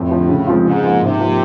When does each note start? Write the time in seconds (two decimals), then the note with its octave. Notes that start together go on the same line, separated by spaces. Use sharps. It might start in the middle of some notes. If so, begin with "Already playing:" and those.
Already playing: F2 A2
0.11 D3 F3
0.29 C#3
0.47 F3 G#3 C4 F4
0.65 G#2 C#3
0.84 F3 A#3
1.01 G#2 C3
1.20 F3 A#3